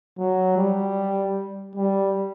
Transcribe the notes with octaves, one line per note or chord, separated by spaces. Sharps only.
F#3
G3
G3